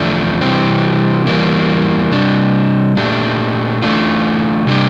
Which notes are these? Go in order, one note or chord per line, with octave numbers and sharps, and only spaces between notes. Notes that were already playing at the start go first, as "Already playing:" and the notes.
Already playing: E2 D3 F3 A3 D4
C3 E3 G3 C4
E2 E3 G3 A#3
C3 G3 D4
A#2 A3 D4 G4
E3 A3 D4 F4
C3 G3 D4 G4